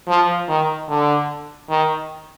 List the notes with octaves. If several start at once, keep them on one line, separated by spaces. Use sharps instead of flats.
F3
D#3
D3
D#3